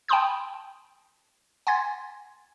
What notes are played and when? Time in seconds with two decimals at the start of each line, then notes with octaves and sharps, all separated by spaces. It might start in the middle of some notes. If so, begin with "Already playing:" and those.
0.08 G5 A5 B5 C6 D#6 G6
1.67 F#5 G#5 C6 G#6 A6